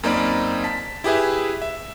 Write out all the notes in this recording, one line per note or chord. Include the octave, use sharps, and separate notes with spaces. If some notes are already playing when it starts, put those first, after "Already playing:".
F#2 A#3 C4 D#4 D5 B5
A5 B6
E4 G4 G#4 B4 E5
E5